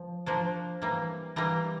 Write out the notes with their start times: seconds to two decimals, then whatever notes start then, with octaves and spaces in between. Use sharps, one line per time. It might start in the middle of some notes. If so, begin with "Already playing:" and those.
Already playing: F3
0.26 F3 A#3 D4
0.82 E3 G3 A#3
1.36 E3 G3 A#3 A#5